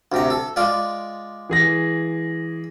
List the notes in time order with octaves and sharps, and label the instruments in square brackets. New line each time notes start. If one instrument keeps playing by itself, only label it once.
[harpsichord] D2 C3 A#5
A4
G#3 F4 D5
[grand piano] E3 G#4 A#6